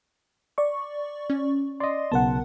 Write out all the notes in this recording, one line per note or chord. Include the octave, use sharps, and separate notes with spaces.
D5 C#6
C#4
D5 D#5 C6
B1 C#3 B3 A#4 F#5 A5